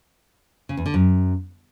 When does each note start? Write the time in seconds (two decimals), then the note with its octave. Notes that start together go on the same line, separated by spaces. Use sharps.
0.69 C#3
0.77 E2
0.86 D3
0.94 F#2